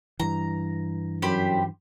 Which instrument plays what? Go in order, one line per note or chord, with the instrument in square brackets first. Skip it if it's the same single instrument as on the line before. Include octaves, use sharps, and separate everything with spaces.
[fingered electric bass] G2 E3 [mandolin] A#5
[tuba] F#2 [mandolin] G4 C5 B5